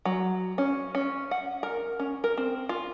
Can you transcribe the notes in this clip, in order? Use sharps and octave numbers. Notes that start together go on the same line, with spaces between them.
F#3
C#4
C#4
F#5
A#4
C#4
A#4
C4
F4